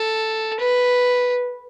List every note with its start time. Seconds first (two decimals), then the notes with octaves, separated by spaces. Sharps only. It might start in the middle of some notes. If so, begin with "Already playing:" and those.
Already playing: A4
0.60 B4